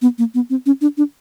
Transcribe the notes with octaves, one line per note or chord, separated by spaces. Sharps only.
B3
A#3
B3
C4
C#4
D4
D4